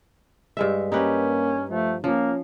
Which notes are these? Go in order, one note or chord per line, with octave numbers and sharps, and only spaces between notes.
G2 G#3 E5
A#3 C#4 D#4 G4 B4
F3 A3
F3 A#3 C#4